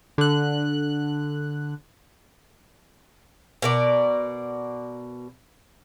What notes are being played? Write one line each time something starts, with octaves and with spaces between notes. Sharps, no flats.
D3 F#6
B2 A#4 D5